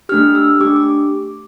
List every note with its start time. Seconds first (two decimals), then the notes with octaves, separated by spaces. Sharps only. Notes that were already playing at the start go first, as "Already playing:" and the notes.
0.09 A3 D4 G4 F6
0.35 E6
0.60 A3 D4 G4 D6
0.76 D6